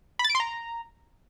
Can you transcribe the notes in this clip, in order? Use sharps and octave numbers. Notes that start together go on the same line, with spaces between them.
B5
A6
D7
C6
A#5